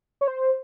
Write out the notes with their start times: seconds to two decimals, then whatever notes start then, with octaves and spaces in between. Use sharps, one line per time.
0.21 C#5
0.28 C5